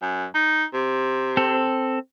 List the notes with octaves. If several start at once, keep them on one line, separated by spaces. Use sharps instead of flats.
F#2
D#4
C3
C4 A4